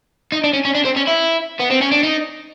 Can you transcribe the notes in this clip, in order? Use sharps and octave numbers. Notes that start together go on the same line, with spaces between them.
D#4
D4
C#4
C#4
D4
C4
C#4
E4
B3
C4
C#4
D4
D#4